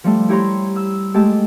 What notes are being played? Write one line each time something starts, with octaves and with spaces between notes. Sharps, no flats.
F3 G3 A3
E4 G4 C#5 A#5 C6
E6
G#3 A3 G4 A5 E6